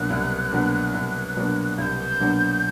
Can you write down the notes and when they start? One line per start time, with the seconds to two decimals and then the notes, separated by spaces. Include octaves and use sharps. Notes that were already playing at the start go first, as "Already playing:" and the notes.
Already playing: C2 B2 F#3 A#3 D4 F#6
0.10 C2
0.51 B2 F#3 A#3 D4
0.94 C2
1.36 B2 F#3 A#3 D4
1.78 C2 G6 G#6
2.20 B2 F#3 A#3 D4